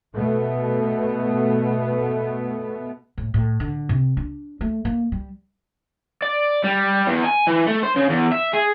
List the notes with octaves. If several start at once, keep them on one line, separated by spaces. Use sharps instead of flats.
B2 A3 B3
A2
A2
D3
C3
D4
A3
A#3
G3
D5
G3
E2
G#5
E3
A3
C5
C#3
E2
E5
G#4